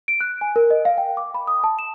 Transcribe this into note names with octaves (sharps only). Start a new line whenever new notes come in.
D7
F#6
G#5
A#4
D#5
F5
G5
D6
B5
D#6
A5
E7